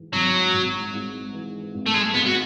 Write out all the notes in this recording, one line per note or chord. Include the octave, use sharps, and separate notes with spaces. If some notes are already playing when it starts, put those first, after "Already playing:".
Already playing: G#2 E3
G#1 F#3
G#1
G#2
E3
G#1
A3
G#3
G#1 B3
F#4